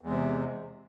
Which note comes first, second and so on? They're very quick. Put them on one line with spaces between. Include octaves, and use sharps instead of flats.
E2 G#3 C3